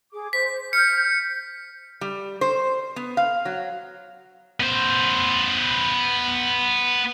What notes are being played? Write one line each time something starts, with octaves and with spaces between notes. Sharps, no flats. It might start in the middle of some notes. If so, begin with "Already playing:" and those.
G#4 D6
C5 B6
F6 G6 C#7
G3
C5
B3
F5
F#3
B3 C5